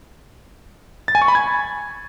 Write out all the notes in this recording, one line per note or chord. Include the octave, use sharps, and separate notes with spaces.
A6
G#5
C#6
B5
G#6